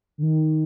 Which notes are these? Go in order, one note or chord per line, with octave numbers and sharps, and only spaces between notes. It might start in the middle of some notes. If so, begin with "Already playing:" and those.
D3
D#3